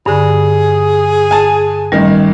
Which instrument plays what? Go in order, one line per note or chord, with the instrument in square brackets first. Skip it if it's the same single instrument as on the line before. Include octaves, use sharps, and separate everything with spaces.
[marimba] G2 D3 [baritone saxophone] G#4
[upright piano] G#5 A5
[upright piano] A1 D#3 [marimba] G3